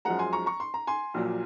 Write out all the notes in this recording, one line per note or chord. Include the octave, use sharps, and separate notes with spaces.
F#2 F3 G#3 F#5 A#5
G#5 C6
A#5 C#6
A#5 C#6
C6
A#5
G#5 C6
A#1 A#2 F#3